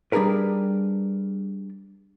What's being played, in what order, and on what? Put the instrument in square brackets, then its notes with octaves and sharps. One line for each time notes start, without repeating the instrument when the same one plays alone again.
[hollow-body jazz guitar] G3 D4 D#4 G#4 A#4 B4